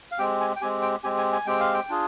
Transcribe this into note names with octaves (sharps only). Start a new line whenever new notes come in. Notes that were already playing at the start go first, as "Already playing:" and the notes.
F5
G#3 C4 G4 G5
G#5
G5
G#3 C4 G4 G#5
G5
G#3 C4 G4 G#5
G#5
G#5
G#3 C4 G4 G5
F5
G5
D4 F4 G#4